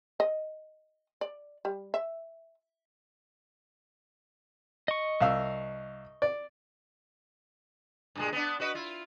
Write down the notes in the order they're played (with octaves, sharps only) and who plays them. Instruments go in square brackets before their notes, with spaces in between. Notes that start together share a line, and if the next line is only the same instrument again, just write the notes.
[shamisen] D#5
D5
G3
E5
[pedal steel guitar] D#5 C#6
[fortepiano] C2 F5 E6
D5
[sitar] G2 A#2 G#3
B3 D4
F#4 B4 D#5
E4 F4